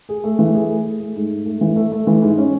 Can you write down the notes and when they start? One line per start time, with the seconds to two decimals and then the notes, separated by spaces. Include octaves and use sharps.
0.09 G#4
0.24 A3
0.39 E3
0.55 G#4
0.70 A3
0.85 G#4
1.00 A3
1.16 G#2
1.31 G#2
1.46 A3
1.61 E3
1.76 A3
1.92 A3
2.07 E3
2.22 G#2
2.37 C#4